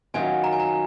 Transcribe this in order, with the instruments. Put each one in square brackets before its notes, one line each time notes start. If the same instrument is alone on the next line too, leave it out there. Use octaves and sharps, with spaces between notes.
[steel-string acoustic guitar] D#3 F#3 C#4 F4 [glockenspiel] G#5
[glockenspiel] A#5
G#5
A#5